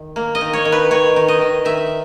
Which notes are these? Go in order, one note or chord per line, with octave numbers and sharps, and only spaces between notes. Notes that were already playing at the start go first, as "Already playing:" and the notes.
Already playing: D#3
A#3
D#5
D#3
C#5
D#3
B4
D#3 C#5
D#3
D#5
D#3
D#3 E5